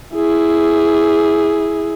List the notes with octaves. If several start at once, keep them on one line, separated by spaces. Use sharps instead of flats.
E4 G#4